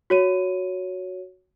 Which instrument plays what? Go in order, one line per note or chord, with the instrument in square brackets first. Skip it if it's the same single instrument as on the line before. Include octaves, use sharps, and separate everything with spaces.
[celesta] F#4 C#5 D#7